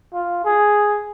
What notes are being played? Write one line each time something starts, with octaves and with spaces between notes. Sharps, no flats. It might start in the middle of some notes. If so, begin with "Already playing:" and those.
F4
G#4